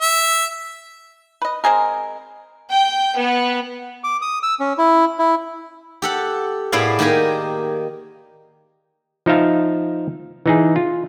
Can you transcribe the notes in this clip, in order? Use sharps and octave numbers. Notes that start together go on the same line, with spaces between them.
E5
B4 D#5
G#3 C4 G#4 A#4
G5
B3
D6
D#6
E6
C#4
E4
E4
G4 A4 F#5
A2 B3 E4 G#4 D5 F5
D#3 A#3 G4 A#4 G#5
F3 D#4 E5 F5 A5
E3 D#4 G#4
F4